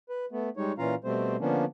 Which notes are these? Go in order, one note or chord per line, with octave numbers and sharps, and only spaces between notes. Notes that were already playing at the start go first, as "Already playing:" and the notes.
B4
A3 B3
G3 G#3 D#4 C#5
A#2 E3 C#4 F4 F5 A#5
B2 G3 A3 C4 C5
D3 F3 A#3 B3 C#4 D4